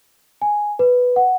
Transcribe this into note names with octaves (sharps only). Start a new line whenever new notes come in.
G#5
B4
F#5